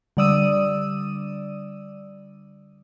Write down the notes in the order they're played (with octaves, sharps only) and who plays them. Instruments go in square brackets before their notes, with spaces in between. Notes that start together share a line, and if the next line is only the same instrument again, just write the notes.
[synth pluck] D3 G3 D5 D#6 E6 D#7